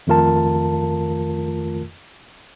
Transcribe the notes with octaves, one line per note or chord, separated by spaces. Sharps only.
F2 D#3 A3 F4 A#4 A5